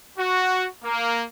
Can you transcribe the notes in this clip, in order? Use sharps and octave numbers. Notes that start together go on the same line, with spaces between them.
F#4
A#3